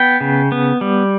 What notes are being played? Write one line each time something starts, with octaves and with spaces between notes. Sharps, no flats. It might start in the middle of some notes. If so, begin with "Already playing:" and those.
Already playing: B3 G5
C#3
B3
G3